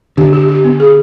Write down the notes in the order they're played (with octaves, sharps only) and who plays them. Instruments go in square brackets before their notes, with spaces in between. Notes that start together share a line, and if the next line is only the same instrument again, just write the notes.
[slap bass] D3 [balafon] G4
[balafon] G4
G4
B3
G#4